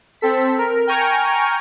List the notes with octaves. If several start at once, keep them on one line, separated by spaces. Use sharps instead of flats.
C4 A4 B6
A#4
G5 G#5 A#5 C#6 F6